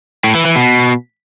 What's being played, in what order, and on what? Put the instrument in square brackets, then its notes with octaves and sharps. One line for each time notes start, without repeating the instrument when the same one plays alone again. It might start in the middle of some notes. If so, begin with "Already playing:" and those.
[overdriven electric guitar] A2
E3
E3
B2